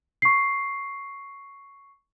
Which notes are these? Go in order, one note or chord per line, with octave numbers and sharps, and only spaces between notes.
C#6 C7